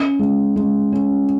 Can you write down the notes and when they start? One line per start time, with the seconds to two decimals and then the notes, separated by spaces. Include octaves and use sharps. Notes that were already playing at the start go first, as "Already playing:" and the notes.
Already playing: C#4
0.19 G#3
0.56 G#3
0.92 C#4